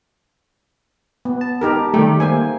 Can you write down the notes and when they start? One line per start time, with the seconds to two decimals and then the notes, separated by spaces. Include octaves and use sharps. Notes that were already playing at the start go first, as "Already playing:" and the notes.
1.25 B3
1.41 A5
1.61 D#4 G4 A#4
1.94 D#3 G3 A3 G4
2.20 A#3 C5 G#5